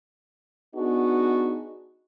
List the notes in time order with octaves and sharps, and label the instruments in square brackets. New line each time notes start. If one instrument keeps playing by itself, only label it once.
[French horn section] B3 D4 D#4 F#4 G#4